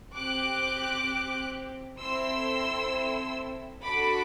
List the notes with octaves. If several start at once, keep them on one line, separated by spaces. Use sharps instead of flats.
C4 G4 D6 F#6
C4 E4 A4 C6 E6
D4 F#4 A4 B5 D6